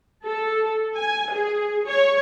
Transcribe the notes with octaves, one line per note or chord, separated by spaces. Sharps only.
A4
G#5
G#4
C#5